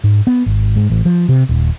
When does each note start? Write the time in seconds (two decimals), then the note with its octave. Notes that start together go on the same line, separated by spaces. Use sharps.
0.04 G#2
0.27 B3
0.46 G#1
0.76 G#2
0.90 A1
1.05 F3
1.29 C3
1.49 D#1